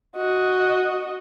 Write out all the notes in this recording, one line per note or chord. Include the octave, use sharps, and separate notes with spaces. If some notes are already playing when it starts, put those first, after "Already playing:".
F#4 D#5